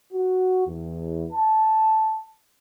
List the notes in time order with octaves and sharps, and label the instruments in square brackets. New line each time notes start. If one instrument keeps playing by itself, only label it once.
[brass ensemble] F#4
E2
A5